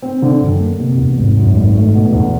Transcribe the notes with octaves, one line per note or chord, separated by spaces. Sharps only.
C4
D3
F#2
A#3
C3
E2
G#1
F#2
G#1
A3
B2
E2